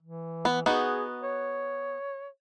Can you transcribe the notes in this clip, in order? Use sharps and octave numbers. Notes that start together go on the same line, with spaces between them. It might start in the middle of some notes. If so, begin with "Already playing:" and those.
E3
B3
B3 D#4 F#4 G#4
C#5